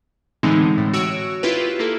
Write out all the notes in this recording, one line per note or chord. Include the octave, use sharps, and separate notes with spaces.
A2 D3 E3 G#3 C4 D#4
A2
F#4 C#5 E6 D7
E4 F4 G4 B4
A#3 E4 A4